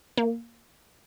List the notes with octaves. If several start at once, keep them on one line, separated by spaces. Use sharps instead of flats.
A#3